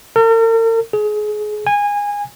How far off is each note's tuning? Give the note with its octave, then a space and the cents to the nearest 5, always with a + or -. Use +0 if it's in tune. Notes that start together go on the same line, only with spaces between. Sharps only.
A#4 -45
G#4 +25
G#5 -20